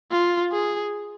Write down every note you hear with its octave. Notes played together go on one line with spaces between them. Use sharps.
F4
G#4